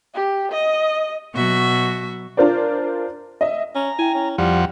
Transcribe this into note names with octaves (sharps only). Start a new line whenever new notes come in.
G4
D#5
B2 F#3 F#4 E5 C#6
D4 F4 A#4 C5 D5
D#5 E5
C#4 A#5
E4 G5 G#5
C#4
F2 F3 G3 F#5